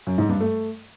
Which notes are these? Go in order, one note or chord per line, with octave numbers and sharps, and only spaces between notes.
F#2
G#2
G2
A3